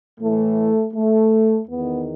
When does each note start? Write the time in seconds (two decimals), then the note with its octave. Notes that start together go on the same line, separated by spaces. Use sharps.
0.20 A2 E3 A3
0.94 A3
1.68 E2 D#3 B3